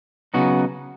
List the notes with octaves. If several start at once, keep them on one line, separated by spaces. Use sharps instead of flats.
C#3 F#3 B3 D#4 F#4